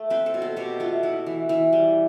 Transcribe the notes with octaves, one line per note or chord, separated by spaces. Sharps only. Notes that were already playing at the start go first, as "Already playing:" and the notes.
Already playing: A3
C4 B4
A4
B2
A4
B2 G4
A3 F4
B3 E4
E3
E3
G3